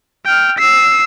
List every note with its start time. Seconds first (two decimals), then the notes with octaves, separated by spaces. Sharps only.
0.25 G5 F6
0.58 E6 C7